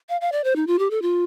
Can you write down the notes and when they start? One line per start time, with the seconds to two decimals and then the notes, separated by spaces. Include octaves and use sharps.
0.09 F5
0.21 F5
0.32 D5
0.44 C5
0.56 D#4
0.67 F4
0.79 G4
0.91 A4
1.02 F4